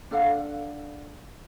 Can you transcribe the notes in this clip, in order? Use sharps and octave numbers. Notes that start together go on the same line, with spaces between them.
D4 A4 F5 F#5